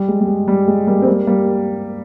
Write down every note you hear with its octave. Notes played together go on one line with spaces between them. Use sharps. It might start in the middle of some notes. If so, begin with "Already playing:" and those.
Already playing: G3
G#3
G3
G#3
G3
G#3
G3 A#3
C4
G3 A#3
G3 A#3